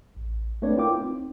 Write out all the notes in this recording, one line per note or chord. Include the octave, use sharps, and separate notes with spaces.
A1
A3 C4 D4 B4 C#5 D5
E4 F4 A#4 G5 D6
C4 D#4